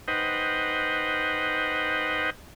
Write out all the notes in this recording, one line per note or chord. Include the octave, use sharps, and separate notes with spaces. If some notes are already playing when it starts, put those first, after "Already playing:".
D#4 B4 C5 D#5 F#5 G5